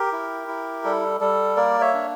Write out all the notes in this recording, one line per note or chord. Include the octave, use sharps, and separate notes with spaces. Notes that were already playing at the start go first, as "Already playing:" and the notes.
Already playing: G4 A#4
E4
E4
G3 A4
G3 A4
A#3 A#4 D5
C#5 E5
D4